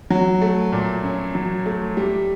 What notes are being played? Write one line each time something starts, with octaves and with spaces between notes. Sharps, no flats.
F#3
A3
A#2
C#4
F#3
A3
G3